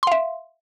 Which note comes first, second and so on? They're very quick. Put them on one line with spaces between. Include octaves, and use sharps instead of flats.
C6 F5 E5